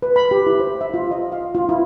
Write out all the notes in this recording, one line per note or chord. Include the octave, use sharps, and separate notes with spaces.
B4
B5
G4
E4
C5
E5
F4
D#5
F5
F4
E4